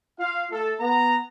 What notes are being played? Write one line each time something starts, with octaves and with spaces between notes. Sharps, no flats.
F4 F5
A3 A4
B3 A#5